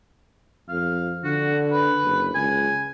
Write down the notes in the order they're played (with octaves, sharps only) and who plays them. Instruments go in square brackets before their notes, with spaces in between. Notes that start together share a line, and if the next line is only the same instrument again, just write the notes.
[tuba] F2 [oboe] F5
[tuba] D3 [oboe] F#4
[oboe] B4
[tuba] F#1
[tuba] C#2 [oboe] G#5